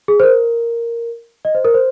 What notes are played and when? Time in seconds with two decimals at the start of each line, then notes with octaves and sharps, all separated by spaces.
0.08 G#4
0.20 C5
0.23 A#4
1.45 D#5
1.55 C5
1.65 A#4
1.74 C5